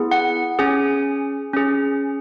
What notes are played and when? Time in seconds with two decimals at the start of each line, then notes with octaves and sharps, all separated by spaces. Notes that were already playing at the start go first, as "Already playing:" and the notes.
Already playing: B3 E4 G#4
0.11 F#5
0.59 C#4 G#4 G#5
1.53 C#4 G#4